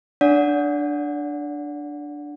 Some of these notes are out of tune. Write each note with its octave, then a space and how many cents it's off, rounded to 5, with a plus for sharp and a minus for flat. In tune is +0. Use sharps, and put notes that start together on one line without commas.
D4 +0 D5 -30 F#5 -15